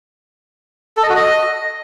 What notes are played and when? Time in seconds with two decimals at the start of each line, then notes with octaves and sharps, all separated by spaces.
0.97 A4
1.03 D#5
1.09 F#4
1.16 D#5